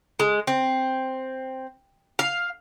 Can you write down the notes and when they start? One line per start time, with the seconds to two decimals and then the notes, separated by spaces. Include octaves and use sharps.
0.20 G#3
0.47 C4
2.19 F5